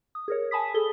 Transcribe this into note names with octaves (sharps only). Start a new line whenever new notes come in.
D#6
G#4 A#4 C#5
G#5 A5 B5 D#6 B6
G#4 A4 G7